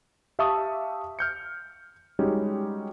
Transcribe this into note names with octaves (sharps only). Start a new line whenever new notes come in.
G4 E5 F5 A5 C#6 D#6
F6 G6 C#7
G3 G#3 C#4 D#4 F#4 G4